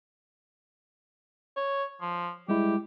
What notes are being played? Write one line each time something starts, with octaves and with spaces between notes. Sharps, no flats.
C#5
F3
G3 G#3 E4 G4